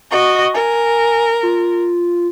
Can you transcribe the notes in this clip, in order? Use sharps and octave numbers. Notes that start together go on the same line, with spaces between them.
F#4 D#5 C#6
A#4 G#5
F4